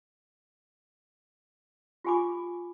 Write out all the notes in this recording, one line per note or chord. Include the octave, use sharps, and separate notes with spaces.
F4 G4 G#5 B5 D6